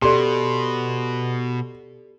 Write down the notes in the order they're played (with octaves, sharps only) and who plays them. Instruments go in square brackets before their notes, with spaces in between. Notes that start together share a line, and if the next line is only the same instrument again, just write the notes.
[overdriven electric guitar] B2 [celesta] G4 A4 D5 [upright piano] C6